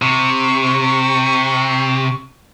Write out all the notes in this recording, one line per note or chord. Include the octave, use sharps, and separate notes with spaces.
C3 C#6